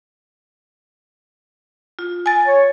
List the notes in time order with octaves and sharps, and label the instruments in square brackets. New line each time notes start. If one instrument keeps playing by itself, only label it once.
[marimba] F4
G#5 A6
[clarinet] C#5